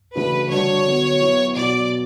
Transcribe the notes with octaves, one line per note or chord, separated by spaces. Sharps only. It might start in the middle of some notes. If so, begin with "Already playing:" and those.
C#3 E3 A3 D4 F#4 B4
D3 G3 D4 F#4 C#5
D3 F#3 B3 F#4
F#3 B3 E4
B2 F#3 B3 F#4 D5